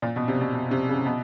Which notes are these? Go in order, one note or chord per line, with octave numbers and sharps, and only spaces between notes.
A#2
B2
C3
B2
B2
C3
C#3
B2